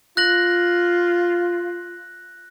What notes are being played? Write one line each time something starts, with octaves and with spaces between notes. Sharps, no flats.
F4 F#6 A#6 F#7